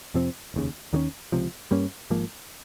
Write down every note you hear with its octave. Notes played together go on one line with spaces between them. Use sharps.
F2 C3 F3 C4
F1 D#2 C#3
D#2 D#3 G3 C#4
C#2 C3 F3
G2 G3 A#3 C#4
G#1 G#2 F3 A#3